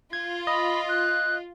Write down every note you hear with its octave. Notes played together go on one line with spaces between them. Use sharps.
F4 G#6
D#5 B5
F#6